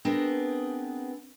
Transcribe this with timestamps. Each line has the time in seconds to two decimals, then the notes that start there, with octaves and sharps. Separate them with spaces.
0.05 B3 C4 D4 G#4 A#4 D#5